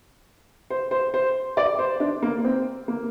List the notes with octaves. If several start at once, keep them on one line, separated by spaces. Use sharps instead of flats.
C5
C5
C5
D5
C5
D4
A#3
C4
A#3